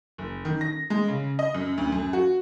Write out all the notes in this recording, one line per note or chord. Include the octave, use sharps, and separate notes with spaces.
F#1
D#3
A#6
G#3
C#3
D#5
F#2
D2
F#2
F#4